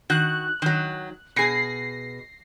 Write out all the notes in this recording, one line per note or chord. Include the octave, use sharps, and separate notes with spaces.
D#3 F#4 F#6
D#3 F#3
B2 G#4 A#6 C7